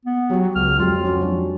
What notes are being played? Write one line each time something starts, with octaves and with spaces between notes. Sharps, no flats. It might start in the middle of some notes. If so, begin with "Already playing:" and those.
B3
F#3 F#4 G4
C#2 F6
F2 F#3 G#3 F4 G4
C#4 F#4
F#3 D4